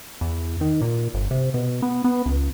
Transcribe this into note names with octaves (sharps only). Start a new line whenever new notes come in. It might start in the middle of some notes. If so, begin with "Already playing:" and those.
E2
D#3
A#2
G1
C3
B2
B3
B3
C#2